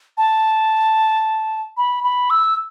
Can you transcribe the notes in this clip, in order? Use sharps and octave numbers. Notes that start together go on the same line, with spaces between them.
A5
B5
B5
E6